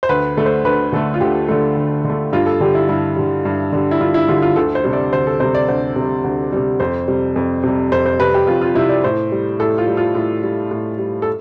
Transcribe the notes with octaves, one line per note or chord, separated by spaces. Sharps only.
C5
D2 B4
D3 A3
C5
D2 B4
D3 A3 A4
F4
D2 G4
D3 A3
D2
D3 A3
G2 F4
A4
D3 G3 G4
E4
G2 E4
D3 G3
G2
D3 G3
E4
G2 F4
E4
D3 G3 F4
F4
D2 A4
C5
C3 G3
D5
D2 C5
A4
C3 G3 C5
D5
D2 C5
C3 G3
D2
C3 G3
F2 C5
C3 G3
F2
C3 G3
F2 C5
C5
C3 G3 B4
G4
F2 F4
F4
C3 G3 E4
D5
A2 C5
G3
A2 A4
F4
G3
F4
A2
G3
A2
G3
A4